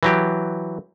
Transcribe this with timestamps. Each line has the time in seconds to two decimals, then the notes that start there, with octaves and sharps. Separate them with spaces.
0.03 E3 F#3 G4